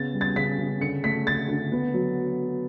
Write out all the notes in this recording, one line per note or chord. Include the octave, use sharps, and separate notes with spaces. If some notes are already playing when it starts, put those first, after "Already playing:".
Already playing: C#3 B3 A6
G3
A6
C#3 B6
C#3
D3 C#7
A3 B6
A3 A6
D3
B3
F#3